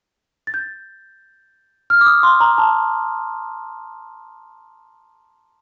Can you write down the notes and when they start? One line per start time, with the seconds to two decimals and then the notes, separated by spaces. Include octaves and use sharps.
0.47 A6
0.54 G6
1.90 F6
2.01 D6
2.06 D#6
2.23 C6
2.40 A#5
2.58 A5